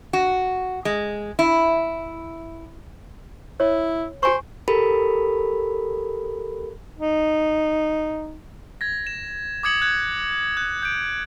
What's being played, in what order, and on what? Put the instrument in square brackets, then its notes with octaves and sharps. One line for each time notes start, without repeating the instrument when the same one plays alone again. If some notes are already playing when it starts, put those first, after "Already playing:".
[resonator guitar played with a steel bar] F#4
G#3
E4
[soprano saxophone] E4 [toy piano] C#5
[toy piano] G4 G#5 C#6 [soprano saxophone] C5
[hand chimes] G4 A4 A#4 B5
[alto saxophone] D#4
[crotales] G#6 A#6
E7
D6 D#6 G#6 C#7 F#7
F#6 G#6
F#6
G6 D7